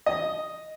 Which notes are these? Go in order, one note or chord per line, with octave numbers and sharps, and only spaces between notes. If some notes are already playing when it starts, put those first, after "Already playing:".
D#5